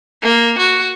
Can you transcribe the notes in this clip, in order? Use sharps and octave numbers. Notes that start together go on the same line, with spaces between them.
A#3
F#4